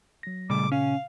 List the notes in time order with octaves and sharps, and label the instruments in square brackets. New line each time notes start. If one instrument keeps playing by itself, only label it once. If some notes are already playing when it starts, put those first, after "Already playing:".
[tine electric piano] F#3 A#6
[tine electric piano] A#2 C#3 [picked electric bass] G3 A3 [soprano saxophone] D6
[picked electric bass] C#4 [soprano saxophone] F5